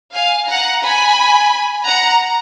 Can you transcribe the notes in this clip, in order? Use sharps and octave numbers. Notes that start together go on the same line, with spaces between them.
F5 G#5
F#5 A#5
G#5 B5
F#5 A#5